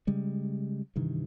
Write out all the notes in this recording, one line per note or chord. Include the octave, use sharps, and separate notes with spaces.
C#3 G3 G#3
G2 C3 D#3 E3